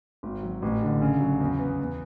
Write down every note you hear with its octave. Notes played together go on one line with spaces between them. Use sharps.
G#1
F#3
A1
D3
C#3
F#3
E2
B3
E2